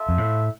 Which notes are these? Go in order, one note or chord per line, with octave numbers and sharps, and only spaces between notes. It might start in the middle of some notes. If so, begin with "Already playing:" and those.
Already playing: F4 A4 E5
F2
A2